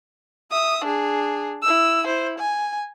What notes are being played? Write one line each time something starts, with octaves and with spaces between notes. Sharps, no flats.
E5 D#6
D4 G#4
E4 E6
E4 C5
G#5